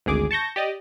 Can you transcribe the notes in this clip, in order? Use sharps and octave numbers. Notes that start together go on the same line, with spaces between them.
G#1 D2 G#4 D6
A5 C#6 G6 A#6
G4 D5 D#5